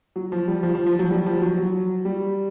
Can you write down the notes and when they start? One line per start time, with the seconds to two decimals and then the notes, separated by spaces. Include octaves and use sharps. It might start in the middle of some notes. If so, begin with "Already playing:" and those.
0.16 F#3
0.32 F3
0.48 G3
0.63 F3
0.75 F3
0.86 F3
0.99 F#3
1.10 G3
1.26 F3
1.42 F#3
1.58 F#3
2.05 G3